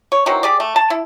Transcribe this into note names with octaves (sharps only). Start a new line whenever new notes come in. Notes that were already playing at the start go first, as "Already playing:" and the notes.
C#5
D#3 E3 F#3 C4
G4 G#4 D5
A3
A5
E4